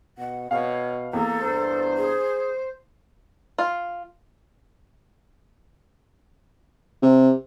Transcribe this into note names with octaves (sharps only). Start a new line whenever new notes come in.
B2 F#5
B2 C#5 F5
E2 A#3 A4
G2 C5
G#4
F4
C3